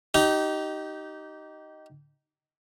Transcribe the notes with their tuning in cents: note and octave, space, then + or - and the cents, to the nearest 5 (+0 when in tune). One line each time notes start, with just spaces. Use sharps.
D#4 +0 G4 -25